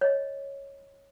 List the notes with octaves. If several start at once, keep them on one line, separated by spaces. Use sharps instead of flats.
C#5 D#5